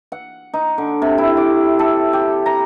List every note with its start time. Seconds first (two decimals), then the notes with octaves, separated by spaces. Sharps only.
0.12 F#5
0.54 D#4
0.78 D3
1.02 C3
1.18 E4
1.37 D6
1.79 A4
2.13 G4
2.46 A#5